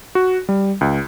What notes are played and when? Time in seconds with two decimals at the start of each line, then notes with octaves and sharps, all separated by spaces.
0.15 F#4
0.49 G3
0.81 C#2